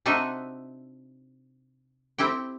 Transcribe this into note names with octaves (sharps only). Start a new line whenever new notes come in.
C3 D4 D#4 F#4 D#5 E5
C4 E4 G4 G5